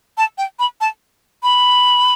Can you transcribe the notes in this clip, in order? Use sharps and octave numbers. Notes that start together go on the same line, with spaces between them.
A5
G5
B5
A5
B5